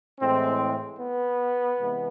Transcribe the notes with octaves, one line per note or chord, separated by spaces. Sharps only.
A2 E3 G#3 C4
B3
C3 E3 G#3